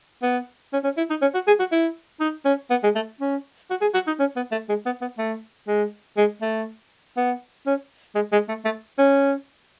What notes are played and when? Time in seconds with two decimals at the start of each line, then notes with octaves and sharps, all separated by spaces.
0.23 B3
0.73 C#4
0.84 C#4
0.97 E4
1.10 D#4
1.22 C#4
1.34 F#4
1.47 G#4
1.60 F#4
1.72 E4
2.20 D#4
2.45 C#4
2.71 B3
2.84 G#3
2.96 A3
3.21 C#4
3.70 F#4
3.81 G#4
3.94 F#4
4.07 D#4
4.20 C#4
4.36 B3
4.52 A3
4.69 G#3
4.86 B3
5.02 B3
5.18 A3
5.68 G#3
6.17 G#3
6.42 A3
7.17 B3
7.67 C#4
8.15 G#3
8.33 G#3
8.49 A3
8.65 A3
8.99 C#4